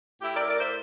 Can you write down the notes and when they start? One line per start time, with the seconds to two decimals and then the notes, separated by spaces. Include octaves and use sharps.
0.21 A2 E4 G4
0.35 A#4 D5
0.47 A2 A#4 D5
0.60 C5 E5